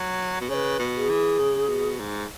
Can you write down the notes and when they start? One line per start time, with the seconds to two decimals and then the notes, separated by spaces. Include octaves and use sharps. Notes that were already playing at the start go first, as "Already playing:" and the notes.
Already playing: F#3
0.41 B2
0.50 C#3 B4 C#5
0.79 B2
0.94 G#4
1.10 E3
1.39 C#3
1.69 B2
2.00 G#2